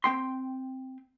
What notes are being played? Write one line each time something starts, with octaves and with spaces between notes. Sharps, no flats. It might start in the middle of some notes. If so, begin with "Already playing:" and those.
C4 G5 C6